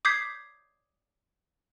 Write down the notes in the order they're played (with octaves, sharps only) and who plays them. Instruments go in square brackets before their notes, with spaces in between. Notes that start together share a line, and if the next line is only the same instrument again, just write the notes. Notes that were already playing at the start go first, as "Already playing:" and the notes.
[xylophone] D6 D#6 G6 G#6 B6 C7